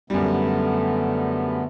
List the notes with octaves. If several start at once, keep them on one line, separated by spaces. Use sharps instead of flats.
F#2 D3 G3 A3 B3